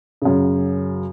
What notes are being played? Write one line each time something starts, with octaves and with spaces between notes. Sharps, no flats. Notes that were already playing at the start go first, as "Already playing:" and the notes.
F#2 C#3